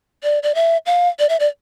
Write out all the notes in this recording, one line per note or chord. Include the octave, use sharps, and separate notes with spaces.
D5
D5
E5
F5
D5
E5
D5